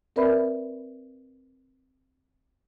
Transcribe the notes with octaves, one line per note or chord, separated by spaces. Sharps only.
C4 A#4 B4 D5 E5 B5